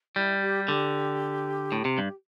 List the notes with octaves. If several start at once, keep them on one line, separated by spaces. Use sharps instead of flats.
G3 E4
G4
D3 G4
A2
C3
G2